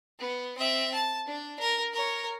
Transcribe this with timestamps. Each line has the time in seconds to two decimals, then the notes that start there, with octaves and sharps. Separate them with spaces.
0.19 B3
0.58 C4 E5
0.94 A5
1.26 D4
1.59 A#4
1.93 A#4 C#5